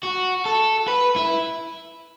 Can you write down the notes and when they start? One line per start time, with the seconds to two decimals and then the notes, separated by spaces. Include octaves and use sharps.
0.03 F#4
0.46 A4
0.88 B4
1.16 E4